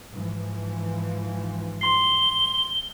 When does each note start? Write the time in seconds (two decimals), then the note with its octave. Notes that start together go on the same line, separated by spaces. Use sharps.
0.11 G#2 E3 F3
1.81 C6 C7 G7